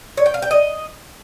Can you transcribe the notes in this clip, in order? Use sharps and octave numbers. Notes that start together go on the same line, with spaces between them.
C#5
G5
F5
G5
D#5